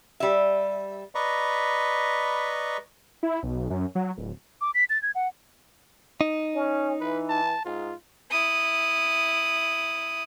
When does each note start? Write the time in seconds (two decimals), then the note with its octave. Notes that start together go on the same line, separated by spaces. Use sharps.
0.20 G3 E5
1.15 B4 D5 D#5 A#5 B5 C#6
3.23 E4
3.43 B1
3.70 F#2
3.95 F#3
4.17 D1
4.61 D6
4.74 B6
4.90 A6
5.02 G#6
5.15 F#5
6.21 D#4
6.55 C#4
7.00 E3 B4
7.29 A5
7.65 G#2 F4
8.31 E4 D#6